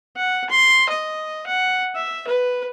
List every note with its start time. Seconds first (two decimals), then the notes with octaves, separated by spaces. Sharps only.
0.17 F#5
0.50 C6
0.89 D#5
1.47 F#5
1.95 E5
2.28 B4